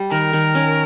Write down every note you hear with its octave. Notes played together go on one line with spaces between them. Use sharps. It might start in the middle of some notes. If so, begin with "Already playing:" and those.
Already playing: G3
D#3 A#4
D#3
C#4